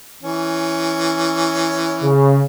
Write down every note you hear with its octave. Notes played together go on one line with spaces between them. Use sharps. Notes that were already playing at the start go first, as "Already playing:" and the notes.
E3 C#4
C#3